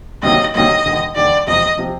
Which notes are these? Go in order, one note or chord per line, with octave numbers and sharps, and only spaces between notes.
D2 C3 D#3 F#3 A#3 D#5
D2 C3 D#3 F#3 A#3 D#5
E1 D#2 D3
E1 D#2 D3 D5
E1 E2 C3 F3 D#5
C3 F3